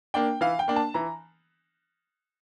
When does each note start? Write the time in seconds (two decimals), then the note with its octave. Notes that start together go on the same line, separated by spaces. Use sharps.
0.14 A#3 D4 G5
0.41 E3 F5
0.59 G5
0.68 A#3 D4
0.76 A5
0.94 E3 A#5